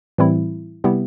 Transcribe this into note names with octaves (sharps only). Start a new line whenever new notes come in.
A2 E3 G3 C4 E4
C3 G3 B3 E4 G4